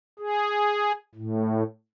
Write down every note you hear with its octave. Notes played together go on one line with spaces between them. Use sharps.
G#4
A2